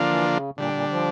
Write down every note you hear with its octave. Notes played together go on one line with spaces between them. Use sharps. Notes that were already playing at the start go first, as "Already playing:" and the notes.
Already playing: D3 F3 A#3 D4 F4
E3
C#3
A#2 D3 G3 D4
A#2
F3